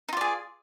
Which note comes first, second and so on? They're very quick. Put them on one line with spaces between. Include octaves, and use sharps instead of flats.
D#4 F4 D5 G#4